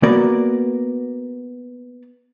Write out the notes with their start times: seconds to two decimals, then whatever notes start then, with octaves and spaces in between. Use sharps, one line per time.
0.03 A#3 B3 F#4 A#4 D5